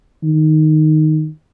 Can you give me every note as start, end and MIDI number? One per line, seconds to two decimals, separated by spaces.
0.24 1.28 51